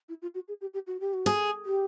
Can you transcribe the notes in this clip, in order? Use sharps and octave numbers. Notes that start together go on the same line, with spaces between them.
E4
F4
F#4
G#4
G4
G4
F#4
G4
F#4
G#4
G4